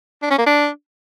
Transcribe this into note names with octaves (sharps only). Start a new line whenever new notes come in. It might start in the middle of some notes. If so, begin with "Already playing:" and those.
D4
C#4
A#3
D4